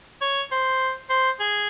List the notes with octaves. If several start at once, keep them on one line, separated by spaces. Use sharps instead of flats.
C#5
C5
C5
G#4